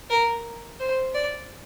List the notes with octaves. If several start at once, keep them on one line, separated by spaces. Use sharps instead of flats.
A#4
C5
D5